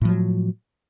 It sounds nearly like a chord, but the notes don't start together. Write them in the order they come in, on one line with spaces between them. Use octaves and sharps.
A2 F3 F#3